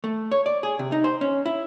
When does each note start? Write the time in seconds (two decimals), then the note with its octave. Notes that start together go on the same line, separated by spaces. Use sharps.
0.04 A3
0.31 C#5
0.46 D5
0.63 G#4
0.79 C3
0.92 D#4
1.04 C5
1.21 C#4
1.46 E4